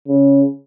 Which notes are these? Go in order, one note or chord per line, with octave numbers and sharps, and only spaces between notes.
C#3